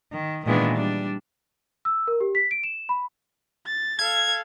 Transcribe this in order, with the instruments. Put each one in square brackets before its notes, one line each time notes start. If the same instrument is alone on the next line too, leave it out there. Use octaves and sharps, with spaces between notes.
[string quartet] D#3
A#2 D#3 E3 G#3 B3 D4
G3 D4
[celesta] E6
A#4
G4
B6
D7
E7
B5
[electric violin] A6
[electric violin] A4 F5 [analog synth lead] G#6